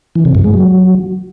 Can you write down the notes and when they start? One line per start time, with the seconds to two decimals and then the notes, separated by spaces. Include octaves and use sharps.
0.15 E3
0.25 C3
0.35 G2
0.44 G#3
0.54 F#3